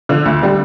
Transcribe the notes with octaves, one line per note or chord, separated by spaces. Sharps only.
D3 F3
D2
D3 G3